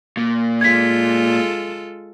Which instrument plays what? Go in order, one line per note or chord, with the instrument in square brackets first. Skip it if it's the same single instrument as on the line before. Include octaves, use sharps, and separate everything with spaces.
[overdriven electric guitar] A#2
[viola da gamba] G#3 F4 A4 [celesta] G#6 B6